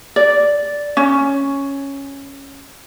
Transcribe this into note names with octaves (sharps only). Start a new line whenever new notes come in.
D5
C#4